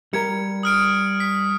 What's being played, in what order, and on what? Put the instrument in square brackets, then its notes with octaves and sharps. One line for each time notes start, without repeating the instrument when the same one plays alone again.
[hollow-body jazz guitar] G3 A#4 [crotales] G#6 C#7
[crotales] D#6 F6 D7
B6